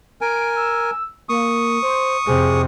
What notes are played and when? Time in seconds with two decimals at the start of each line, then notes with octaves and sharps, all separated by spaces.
0.21 A#4 G#5 D7
0.56 E6
1.29 A#3 C#6 D#6
1.83 C5
2.27 F2 C3 G#4